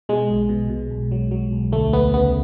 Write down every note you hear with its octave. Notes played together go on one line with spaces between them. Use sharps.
B2 G#3
B1
B2
B2
B1
F#3
F#3
B1
D2 A3
D2 B3
C#3 B3